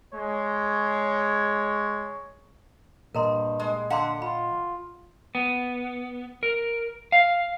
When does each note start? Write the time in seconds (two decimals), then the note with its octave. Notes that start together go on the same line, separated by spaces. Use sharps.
0.13 G#3 C#5
3.15 G2 A#2 A#4 D#5 A#5 C6
3.60 G#3
3.90 D3 F5 F#5 A#5 C6
4.22 F4 B5
5.35 B3
6.43 A#4
7.12 F5